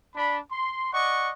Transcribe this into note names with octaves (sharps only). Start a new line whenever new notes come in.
D4 B5
C6
D5 D#5 F#5 C#6